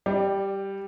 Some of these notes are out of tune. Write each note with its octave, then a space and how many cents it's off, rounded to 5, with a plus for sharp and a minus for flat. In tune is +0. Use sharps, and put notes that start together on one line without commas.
G3 +0 D5 +30